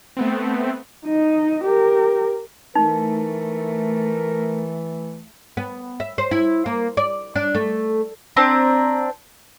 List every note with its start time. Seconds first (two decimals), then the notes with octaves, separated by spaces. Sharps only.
0.17 A3 B3 C4
1.06 D#4 D#5
1.64 G4 A#4
2.75 E3 A3 D#4 A#4
5.57 B3
6.00 E5
6.18 C5
6.31 E4
6.66 A#3
6.97 D5
7.36 D4
7.55 A3
8.37 C4 D4 A#5